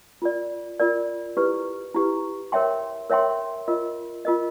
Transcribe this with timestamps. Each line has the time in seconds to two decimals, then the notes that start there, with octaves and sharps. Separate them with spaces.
0.22 F4 A#4 D5
0.80 F4 A#4 D5
1.37 E4 G4 B4
1.94 E4 G4 B4
2.52 A#4 C#5 E5 G5 C6
3.10 A#4 C#5 E5 G5 C6
3.68 F4 A#4 D#5
4.25 F4 A#4 D#5